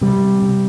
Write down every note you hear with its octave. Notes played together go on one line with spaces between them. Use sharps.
C3 G3
C3